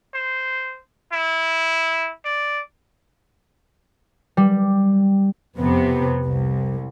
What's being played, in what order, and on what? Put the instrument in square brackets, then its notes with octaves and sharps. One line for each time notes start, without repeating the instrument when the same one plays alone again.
[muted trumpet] C5
E4
D5
[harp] G3
[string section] F2 C3 B3
C2